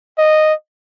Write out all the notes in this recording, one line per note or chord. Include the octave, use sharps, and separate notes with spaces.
D#5